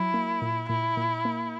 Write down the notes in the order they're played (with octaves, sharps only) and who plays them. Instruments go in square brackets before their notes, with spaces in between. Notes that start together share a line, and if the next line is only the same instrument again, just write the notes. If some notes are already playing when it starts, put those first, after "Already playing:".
Already playing: [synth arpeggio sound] F#3 [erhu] E4
[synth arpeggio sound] A#3
A#2
[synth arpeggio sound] A#2 [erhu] E4
[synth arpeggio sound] A#2
A#3